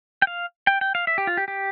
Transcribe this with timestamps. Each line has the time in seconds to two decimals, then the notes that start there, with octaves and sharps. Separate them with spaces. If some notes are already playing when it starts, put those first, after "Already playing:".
0.22 G5
0.27 F5
0.67 G5
0.81 G5
0.95 F5
1.07 E5
1.18 G4
1.27 F4
1.37 G4
1.48 G4